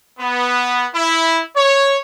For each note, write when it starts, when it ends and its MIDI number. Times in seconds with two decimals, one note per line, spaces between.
0.20 0.87 59
0.95 1.41 64
1.56 1.98 73